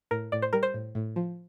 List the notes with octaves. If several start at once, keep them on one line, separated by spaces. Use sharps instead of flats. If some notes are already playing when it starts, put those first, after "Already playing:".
A2 A#4
A2 D5
C5
G3 A#4
C5
A2
A2
F3